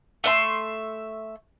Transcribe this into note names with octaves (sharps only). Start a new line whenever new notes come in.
A3 E5 C6